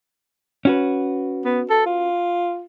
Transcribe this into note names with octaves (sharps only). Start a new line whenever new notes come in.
C#4 F#4 B4
B3
A4
F4